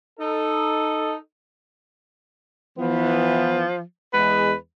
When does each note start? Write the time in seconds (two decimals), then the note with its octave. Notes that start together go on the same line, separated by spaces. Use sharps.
0.19 D#4 A4
2.78 E3 F3 B3
4.14 E2 G#3 B4